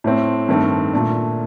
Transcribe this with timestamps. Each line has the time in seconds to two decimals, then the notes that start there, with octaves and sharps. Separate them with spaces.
0.04 A2 A3 C4
0.49 G2 D#3 A3 C4
0.93 A#2 A3 D4